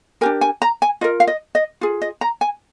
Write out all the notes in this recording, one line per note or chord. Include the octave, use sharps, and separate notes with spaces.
D4 G4 A#4 G#5
G#5
A#5
G#5
F4 A#4 D#5
F5
D#5
D#5
F4 G#4
D#5
A#5
G#5